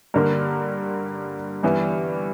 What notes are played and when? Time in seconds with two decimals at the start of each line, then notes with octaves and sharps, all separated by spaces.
0.14 G2 D3 A#3 A#4
1.63 G2 E3 B3